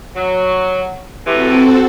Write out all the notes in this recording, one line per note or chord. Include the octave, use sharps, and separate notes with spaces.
F#3
A2 C3 E3 C4 F#4 A4